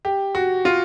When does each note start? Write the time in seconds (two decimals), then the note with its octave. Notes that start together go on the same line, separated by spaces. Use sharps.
0.05 G4
0.35 F#4
0.65 F4